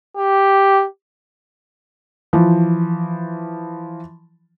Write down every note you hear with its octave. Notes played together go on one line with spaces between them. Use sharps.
G4
E3 F3